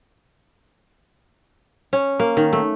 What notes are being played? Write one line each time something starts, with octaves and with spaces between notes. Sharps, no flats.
C#4
A#3
D#3
A3